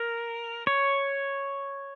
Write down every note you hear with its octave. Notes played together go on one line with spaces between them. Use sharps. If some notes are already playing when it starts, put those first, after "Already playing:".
Already playing: A#4
C#5